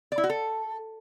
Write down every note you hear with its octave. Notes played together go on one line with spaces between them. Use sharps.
D5
E4
F#4
A4